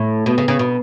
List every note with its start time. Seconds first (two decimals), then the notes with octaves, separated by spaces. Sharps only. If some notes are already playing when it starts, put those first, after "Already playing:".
Already playing: A2 A3
0.26 B2 B3
0.38 C#3
0.48 C#3
0.59 B2